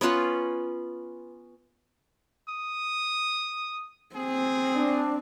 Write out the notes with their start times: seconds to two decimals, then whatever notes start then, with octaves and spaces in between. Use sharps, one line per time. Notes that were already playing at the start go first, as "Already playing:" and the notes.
0.01 B3 C#4 F4 B4
2.49 D#6
4.16 C4 G#4
4.75 D4